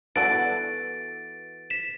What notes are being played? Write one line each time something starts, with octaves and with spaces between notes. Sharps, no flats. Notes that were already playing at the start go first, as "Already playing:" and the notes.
E3 B3 F#4 A4 D5 A6 D7
B6 E7